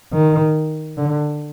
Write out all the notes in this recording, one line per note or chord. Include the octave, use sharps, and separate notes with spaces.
D#3
D3